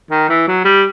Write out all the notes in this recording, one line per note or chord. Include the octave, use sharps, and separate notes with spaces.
D#3
E3
F#3
G3